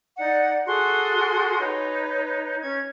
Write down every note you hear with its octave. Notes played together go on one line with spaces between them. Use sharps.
D#4 D5 F#5
F#4 G#4 A4 C6
D#4 B4 C#5
C#4 G#6